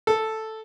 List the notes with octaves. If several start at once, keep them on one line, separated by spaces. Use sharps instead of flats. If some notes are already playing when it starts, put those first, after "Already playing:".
A4